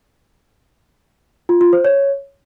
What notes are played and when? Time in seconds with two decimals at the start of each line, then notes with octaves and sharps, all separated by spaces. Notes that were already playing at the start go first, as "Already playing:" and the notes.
1.49 F4
1.61 F4
1.73 C5
1.85 C#5